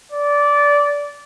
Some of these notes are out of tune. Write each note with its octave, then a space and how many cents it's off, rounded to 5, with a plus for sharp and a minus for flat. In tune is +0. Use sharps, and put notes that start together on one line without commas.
D5 -15